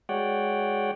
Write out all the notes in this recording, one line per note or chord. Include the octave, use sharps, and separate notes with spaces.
G#3 F#4 C#5 D5 F#5 G5